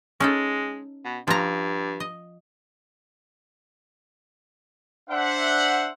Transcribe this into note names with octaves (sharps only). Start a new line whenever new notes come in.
G#3 C#4 D#4 A4
B2
G2 F3 A#5
D#5
D4 C5 E5 F#5